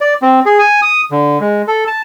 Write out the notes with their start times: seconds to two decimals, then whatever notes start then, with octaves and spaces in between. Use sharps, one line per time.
0.01 D5
0.22 C4
0.46 G#4
0.59 G#5
0.82 D#6
1.11 D3
1.41 G#3
1.68 A4
1.87 A5